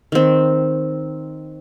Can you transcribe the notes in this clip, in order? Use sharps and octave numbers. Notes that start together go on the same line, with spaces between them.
D#3 C4